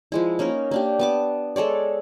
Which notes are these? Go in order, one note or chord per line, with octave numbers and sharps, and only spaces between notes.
F3 G#3 E4
A#3 C#4 D#4 A#4
A#3 D4 G4
B3 A5 D6
G#3 A4 C#5 D5